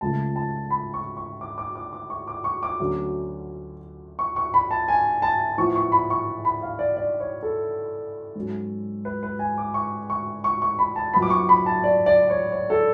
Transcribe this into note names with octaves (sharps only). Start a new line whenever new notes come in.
C#2 C#3 F3 A3 A5
A5
B5
C#6
C#6
D6
D6
D6
D6
C#6
D6
C#6
D6
D2 D3 F#3 C#4
C#6
C#6
B5
A5
G#5
A5
A2 F3 B3 C#6
C#6
B5
C#6
B5
F5
D5
D5
C#5
A4
G#2 F#3 C#4
B4
B4
G#5
D6
C#6
C#6
C#6
C#6
B5
A5
F#2 F3 B3 B5
D6
C#6
B5
A5
D5
D5
C#5
C#5
A4